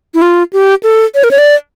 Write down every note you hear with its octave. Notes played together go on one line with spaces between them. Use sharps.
E4
F4
G4
A4
C#5
A#4
C#5
D5